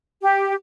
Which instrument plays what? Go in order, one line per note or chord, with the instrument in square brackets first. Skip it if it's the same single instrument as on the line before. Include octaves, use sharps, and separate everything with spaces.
[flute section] G4